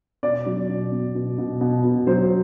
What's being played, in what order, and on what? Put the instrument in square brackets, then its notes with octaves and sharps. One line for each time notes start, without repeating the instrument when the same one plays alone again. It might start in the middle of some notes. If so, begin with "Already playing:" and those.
[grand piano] B2 D5
F#3
B2
B2
B2
B2
B2
B2
F#3 C5